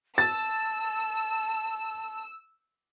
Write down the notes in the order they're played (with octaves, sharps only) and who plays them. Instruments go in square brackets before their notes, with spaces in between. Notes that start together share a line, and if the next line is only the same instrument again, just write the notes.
[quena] A5 [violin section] E6 [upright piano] A6